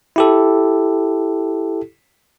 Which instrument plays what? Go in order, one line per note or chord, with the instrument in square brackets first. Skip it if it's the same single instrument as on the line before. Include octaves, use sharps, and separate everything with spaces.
[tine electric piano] E4 G4 A4